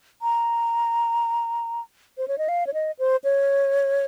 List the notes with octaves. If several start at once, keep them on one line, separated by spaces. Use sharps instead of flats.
A#5
C5
C#5
D#5
F5
C#5
D#5
C5
C#5